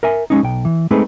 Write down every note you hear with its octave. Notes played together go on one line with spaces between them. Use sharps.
A#4 E5 G#5
G#3 C#4 D#4
B1 G5
E3
G#3 A3 C4 D#4 G#4 B4